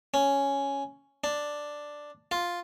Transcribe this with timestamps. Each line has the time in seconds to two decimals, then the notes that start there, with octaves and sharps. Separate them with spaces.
0.14 C#4
1.24 D4
2.31 F4